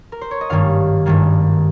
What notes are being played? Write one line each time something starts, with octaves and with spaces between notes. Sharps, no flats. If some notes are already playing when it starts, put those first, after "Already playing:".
A#4
C5
C#5
D#5
G#1 G2 D#3 G3 A#3 F5
G#1 G2 D#3 G3 A#3